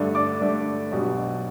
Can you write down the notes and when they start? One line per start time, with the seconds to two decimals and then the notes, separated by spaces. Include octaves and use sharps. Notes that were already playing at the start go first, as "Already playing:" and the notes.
Already playing: G2 D3 A3 D4
0.15 D5 D6
0.41 G2 D3 A3 D4
0.92 B1 B2 G3